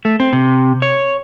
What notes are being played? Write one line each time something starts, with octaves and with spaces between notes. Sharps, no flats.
A3
C4
C3
C#5